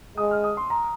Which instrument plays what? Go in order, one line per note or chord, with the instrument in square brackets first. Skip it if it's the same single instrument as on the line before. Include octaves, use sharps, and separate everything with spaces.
[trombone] G#3 [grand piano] D#6
[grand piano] F6
D#6
C6
A#5